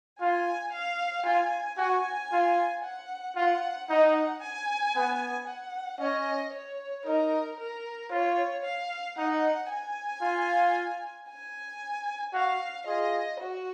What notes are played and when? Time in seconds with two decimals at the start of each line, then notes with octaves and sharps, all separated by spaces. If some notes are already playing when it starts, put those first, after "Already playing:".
0.19 F4 G#5
0.72 F5
1.25 F4 G#5
1.78 F#4 G#5
2.31 F4
2.83 F#5
3.36 F4 F#5
3.89 D#4 F#5
4.42 G#5
4.95 B3
5.47 F#5
6.00 C#4 D#5
6.53 C#5
7.06 D#4 A#4
7.59 A#4
8.11 F4 C#5
8.64 F5
9.17 D#4 F#5
9.70 G#5
10.22 F4
11.28 G#5
12.34 F#4 F5
12.86 F4 G#4 D#5
13.39 F#4